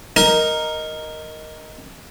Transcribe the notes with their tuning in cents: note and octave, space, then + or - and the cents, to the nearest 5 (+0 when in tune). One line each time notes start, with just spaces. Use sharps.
D#4 +0 A#4 +0 D#6 +0